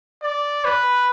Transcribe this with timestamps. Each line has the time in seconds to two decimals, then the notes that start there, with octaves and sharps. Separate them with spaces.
0.23 D5
0.65 B4